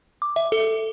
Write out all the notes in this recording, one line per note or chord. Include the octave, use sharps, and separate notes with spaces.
D6
E5
A4